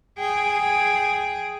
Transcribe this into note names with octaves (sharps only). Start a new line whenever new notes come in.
G#4 G5